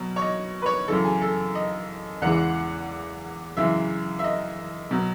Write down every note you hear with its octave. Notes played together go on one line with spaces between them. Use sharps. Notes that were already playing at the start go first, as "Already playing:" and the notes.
Already playing: B2 F#3
C#5
D#5
B4
C#5
F#2 C#3 E3 A4
G#4
A4
D#5
E2 C#3 E3 G#3 F#5
F#2 C#3 E3 G#3 E5
E5
D#5
B2 F#3